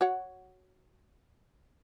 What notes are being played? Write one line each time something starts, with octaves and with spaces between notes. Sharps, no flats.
F#4 C#5 F#5